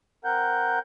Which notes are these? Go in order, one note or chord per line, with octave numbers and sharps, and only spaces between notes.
C4 A#4 F#5 G6